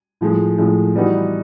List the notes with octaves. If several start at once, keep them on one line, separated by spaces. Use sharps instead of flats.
A2 F3 G#3
A2 F3 G#3
E3 G3 B3 D#4 F#4